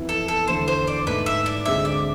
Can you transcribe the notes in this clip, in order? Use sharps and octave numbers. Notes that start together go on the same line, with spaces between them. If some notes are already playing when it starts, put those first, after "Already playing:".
Already playing: F2 E3 B3 E4
A4
A4
E2 D3 A3 E4 A4 C5
C5
D5
G#2 E3 A3 B4
E5
D5
D2 D3 G#3 C4 G#4 E5
D5